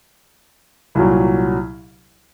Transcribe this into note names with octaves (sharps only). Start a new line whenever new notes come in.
C2 A#2 F#3